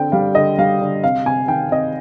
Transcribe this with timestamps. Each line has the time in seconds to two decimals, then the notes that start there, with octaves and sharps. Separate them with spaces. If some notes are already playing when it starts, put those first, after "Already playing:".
Already playing: D3 C4 G5
0.12 G3 F5
0.35 D3 D#5
0.59 G3 F5
0.81 D3
1.04 C3 F5
1.26 C3 G#5
1.48 D#3 G5
1.71 C3 D#5